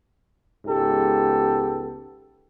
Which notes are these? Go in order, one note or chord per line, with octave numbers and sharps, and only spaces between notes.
C#2 G#2 B3 G4 A4